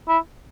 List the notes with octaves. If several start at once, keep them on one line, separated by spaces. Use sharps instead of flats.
E4